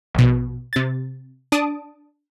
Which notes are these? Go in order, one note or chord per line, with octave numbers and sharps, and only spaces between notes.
A#1 B2
C3 A6
D4 A5 D#6 D7